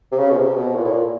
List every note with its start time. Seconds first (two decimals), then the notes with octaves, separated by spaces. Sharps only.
0.12 C3
0.18 C#3
0.31 B2
0.37 C3
0.56 B2
0.76 A#2
0.84 A2
0.92 A#2